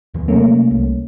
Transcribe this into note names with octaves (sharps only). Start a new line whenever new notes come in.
D#2 E3
C3 F#3 A3 A#3 C#4
C2